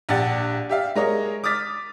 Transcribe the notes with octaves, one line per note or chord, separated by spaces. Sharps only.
A#1 D4 G4 F#5 A6
G4 E5 F5
G#3 A#4 C#5 D#5
D6 D#6 F6 A6 B6